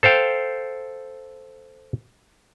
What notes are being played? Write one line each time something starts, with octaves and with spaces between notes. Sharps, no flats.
A4 C5 F5 G5